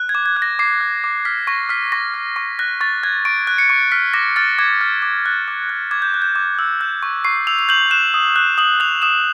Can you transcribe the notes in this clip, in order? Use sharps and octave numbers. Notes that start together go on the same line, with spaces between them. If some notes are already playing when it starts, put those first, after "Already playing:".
Already playing: F#6
G#6
D6
G#6
F#6
A#6
D6 C7
F#6
D6
F6 B6
C#6 A#6
F6 B6
C#6 A#6
F6
C#6
F#6 A#6
C#6 A6
F#6 G#6
C#6 D7
F#6
C#7
C#6
F6 B6
D6 A#6
F6 A6
D6 G#6
F6
D6
F#6
D6
F#6
D6 G#6
G6
F#6
G6
D6
E6
G6
C#6
C#6 C7
E6 F7
F7
G6 F#7
F#6 E7
D#6
F#6
D#6 F#7
F#6 F7
D#6 E7